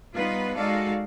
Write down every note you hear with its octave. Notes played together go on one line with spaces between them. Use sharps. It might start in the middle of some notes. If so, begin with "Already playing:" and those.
G3 B3 D#4 F4 B4
G#3 D#4 F#4 A4 D5 F5